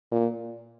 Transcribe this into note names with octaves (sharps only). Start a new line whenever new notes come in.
A#2